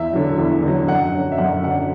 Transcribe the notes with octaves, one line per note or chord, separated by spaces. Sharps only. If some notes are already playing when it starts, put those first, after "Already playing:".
Already playing: E2 E5
D3 F#3
E2
D3 F#3
F#2 F#5
D3 F#3
E5
F#2 F#5
D3 F#3 F#5